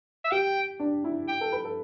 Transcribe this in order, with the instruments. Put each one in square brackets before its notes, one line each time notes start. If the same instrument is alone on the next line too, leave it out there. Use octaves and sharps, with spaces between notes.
[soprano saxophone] E5
[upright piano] G4 [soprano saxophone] G5
[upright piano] D4
E4
[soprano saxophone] G5
[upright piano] A4
B4
A4